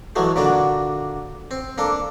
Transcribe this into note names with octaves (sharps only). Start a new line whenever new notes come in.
E3 F#3 G#3 A3
A#2 D3 D4 F#4
C4
A#3 D4 A4